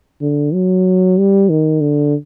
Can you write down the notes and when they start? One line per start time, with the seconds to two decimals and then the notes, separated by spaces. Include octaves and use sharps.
0.21 D3
0.53 F#3
1.18 G3
1.49 D#3
1.81 D3